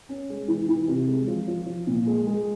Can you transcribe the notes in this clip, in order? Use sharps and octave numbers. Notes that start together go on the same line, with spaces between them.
C#4
G#3
E3
E3
C3
G#3
F3
F3
F3
A#2
G#3
G#3